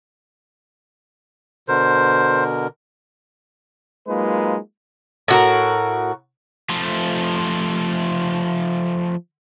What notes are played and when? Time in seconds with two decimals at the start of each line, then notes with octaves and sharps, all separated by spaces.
1.68 B2 D3 A#4 C5
4.08 F#3 G#3 A#3 D#4 F4 B4
5.28 A2 F#4 A#4
6.70 F3 A3